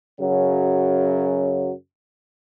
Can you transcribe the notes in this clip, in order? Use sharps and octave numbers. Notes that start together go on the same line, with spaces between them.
F#2 C#3 F#3